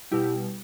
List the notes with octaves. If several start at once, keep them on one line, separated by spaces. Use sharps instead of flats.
B2 G3 E4 G4